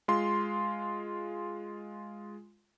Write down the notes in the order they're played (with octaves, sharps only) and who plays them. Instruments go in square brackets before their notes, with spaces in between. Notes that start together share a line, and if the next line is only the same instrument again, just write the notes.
[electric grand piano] G#3 F4 C6